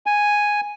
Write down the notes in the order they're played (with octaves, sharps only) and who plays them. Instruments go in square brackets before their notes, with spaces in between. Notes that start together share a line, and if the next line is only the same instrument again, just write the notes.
[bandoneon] G#5